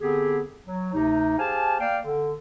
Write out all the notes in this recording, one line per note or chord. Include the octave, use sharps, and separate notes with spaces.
D3 B3 C4 G4 G#4
F#3
D2 C3 D#4
G4 G#4 C5 F5 G#5 A5
A#3 D5 F5 G5
D3